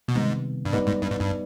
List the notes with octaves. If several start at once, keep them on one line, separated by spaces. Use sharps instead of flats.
B2
G#2 C3 D#3 G3 B3
G2
G#2 G3 B3 D#4 B4 D5
G#2
G2
G#2
G2